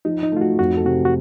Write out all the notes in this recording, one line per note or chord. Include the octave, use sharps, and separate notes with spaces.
F3 D#4
D#4
A3 F4
F#4
F2 F#4
A4
C3 F#4
F#4